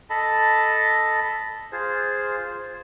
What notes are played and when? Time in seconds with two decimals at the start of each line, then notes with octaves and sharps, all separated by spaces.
0.10 A4 D#5 A5 B5
1.72 F4 G#4 C5
2.47 C5